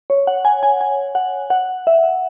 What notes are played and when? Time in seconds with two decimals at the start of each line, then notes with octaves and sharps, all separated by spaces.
0.10 C#5
0.27 F#5
0.45 G#5
0.63 G#5
0.81 G#5
1.15 F#5
1.50 F#5
1.87 E5